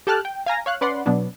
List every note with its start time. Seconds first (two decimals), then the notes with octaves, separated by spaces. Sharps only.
0.07 G4 A4 G5 A5 F6 F#6
0.25 G5
0.46 F5 G#5 A#5 A#6
0.66 C#5 F5 F#6
0.81 C#4 B4 D5 F#5 C6
1.06 B2 F#3 B3 D4